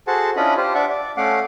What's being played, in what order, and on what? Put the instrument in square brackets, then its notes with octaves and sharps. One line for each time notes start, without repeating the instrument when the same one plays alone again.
[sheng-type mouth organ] F#4 G#4 A4 C5 F#5 A5
C#4 D4 E4 F4 D#5 B5
F4 G4 C5
D4 D5 E5 F#5
D5
A3 C#4 F5 F#5 D6